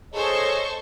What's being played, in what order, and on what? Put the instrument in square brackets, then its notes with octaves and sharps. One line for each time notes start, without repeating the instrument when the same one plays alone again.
[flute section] G#4 C#5 D#5 [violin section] A4 C5 C#6